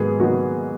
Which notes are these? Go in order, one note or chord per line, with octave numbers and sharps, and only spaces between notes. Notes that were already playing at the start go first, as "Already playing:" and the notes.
Already playing: G#2 D#3 F#3 B3 G#4
D#3 F#3 B3 F#4